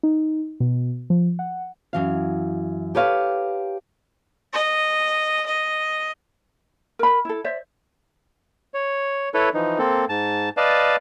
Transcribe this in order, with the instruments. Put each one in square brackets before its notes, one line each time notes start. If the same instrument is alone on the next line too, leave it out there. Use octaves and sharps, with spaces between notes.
[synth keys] D#4
B2
F3
F#5
[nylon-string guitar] F#2 E3 F5
G4 A4 B4 C#5 F5
[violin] D#5
D#5
[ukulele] A#4 B5
E4 A4
C5 D5 E5
[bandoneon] C#5
E4 A4 B4 C#5
E3 F3 D#4
A#3 C4 A4
G#2 A5
B4 D5 D#5 F5 A5